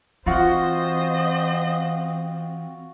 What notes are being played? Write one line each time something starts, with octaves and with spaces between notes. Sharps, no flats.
E3 C4 F4 F#4 C5 D#5